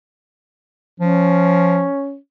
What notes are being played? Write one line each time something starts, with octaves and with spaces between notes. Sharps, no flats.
F3 C#4